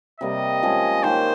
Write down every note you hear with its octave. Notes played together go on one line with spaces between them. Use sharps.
C3 G3 A#3 D#5
F3 G#3 C#4 G#4
D#3 A#3 C#4 C5